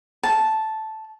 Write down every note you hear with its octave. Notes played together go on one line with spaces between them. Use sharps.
A5